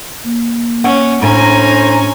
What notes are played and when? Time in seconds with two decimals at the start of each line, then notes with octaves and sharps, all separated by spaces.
0.24 A#3
0.84 C#4 F#5
1.22 A2 C#4 D4 A4 C5 G#5 A#5